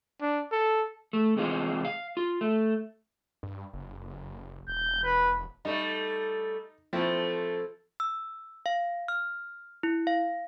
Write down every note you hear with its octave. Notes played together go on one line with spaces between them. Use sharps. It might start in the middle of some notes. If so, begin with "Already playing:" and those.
D4
A4
A3
E2 C3 G#3 C4 F4
F5
F4
A3
G2
F#1
E1 G6
B4
G3 A3 D#4
F3 A3 C4 E4
E6
F5
F6
E4
F5